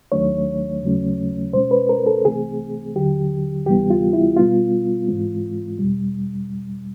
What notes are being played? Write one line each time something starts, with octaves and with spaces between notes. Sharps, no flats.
D#2 D#3 F#3 A3 D4 C#5
D#2 C#3 F#3 A3 C#4
B2 G#3 C#4 C5
B4
A#4
A4
C2 C3 E3 A3 C4 G#4
D#2 D3 F#3 G4
D2 C3 E3 G3 B3 G4
F4
E4
B2 G3 B3 F4
G#2 E3 G#3 C4
E2 B2 G3